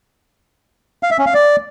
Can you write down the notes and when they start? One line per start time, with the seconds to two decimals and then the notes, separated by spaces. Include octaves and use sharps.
1.03 F5
1.11 E5
1.19 C#4
1.26 F5
1.34 D5